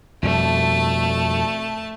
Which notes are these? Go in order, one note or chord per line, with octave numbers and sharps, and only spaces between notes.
F2 B2 G3 A3 A5